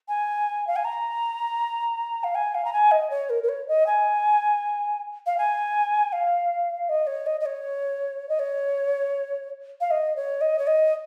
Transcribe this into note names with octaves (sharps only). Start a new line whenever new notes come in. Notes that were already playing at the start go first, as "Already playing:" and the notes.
G#5
F5
G#5
A#5
F5
G#5
F5
A#5
G#5
D#5
C#5
A#4
A#4
C#5
D#5
G#5
F5
G#5
F5
D#5
C#5
D#5
D#5
C#5
D#5
C#5
F5
D#5
C#5
D#5
C#5
D#5